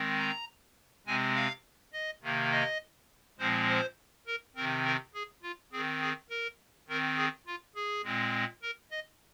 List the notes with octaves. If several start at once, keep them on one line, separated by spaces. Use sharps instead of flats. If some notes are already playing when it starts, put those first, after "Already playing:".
Already playing: D#3 G#3 C4
A#5
C3 G#3 C4 G#5
F5
D#5
C3 D#3 A#3
D#5
A#2 F3 G#3 C4 C5
C5
A#4
C3 D#3 C4 A#4
A#4
G#4
F4
D#3 C4 G#4
G#4
A#4
D#3 C4 A#4
G#4
F4
G#4
A#2 G#3 C4
A#4
D#5